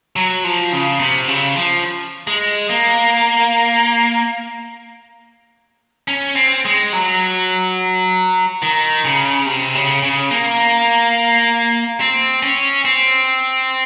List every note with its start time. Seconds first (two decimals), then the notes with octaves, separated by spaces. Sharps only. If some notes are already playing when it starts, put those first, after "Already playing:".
0.16 F#3
0.44 F3
0.72 C#3
1.00 C3
1.28 C#3
1.56 F3
2.27 G#3
2.70 A#3
6.08 C#4
6.36 C4
6.65 G#3
6.93 F#3
8.62 D#3
9.05 C#3
9.46 C3
9.75 C#3
10.03 C#3
10.31 A#3
12.00 C4
12.43 C#4
12.85 C4